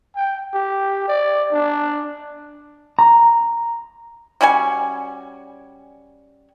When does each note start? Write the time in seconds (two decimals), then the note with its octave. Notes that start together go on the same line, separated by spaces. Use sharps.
0.15 G5
0.54 G4
1.08 D5
1.52 D4
2.99 A#5
4.41 G3 C#4 F#4 G#5